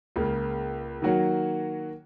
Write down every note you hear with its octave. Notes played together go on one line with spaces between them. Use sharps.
C#2 C#3 A#3
D#3 F#3 A#3 F#4 C#5